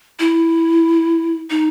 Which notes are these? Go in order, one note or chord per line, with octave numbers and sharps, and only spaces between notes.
E4
D#4